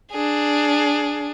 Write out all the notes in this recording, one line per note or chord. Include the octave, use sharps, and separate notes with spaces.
D4 G#4